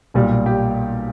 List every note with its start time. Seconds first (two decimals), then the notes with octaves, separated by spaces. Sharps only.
0.14 B1 A#2 G3
0.46 G4